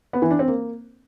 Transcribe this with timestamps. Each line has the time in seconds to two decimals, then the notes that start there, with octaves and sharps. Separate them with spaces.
0.13 B3
0.22 E3
0.31 D4
0.39 C4
0.48 A#3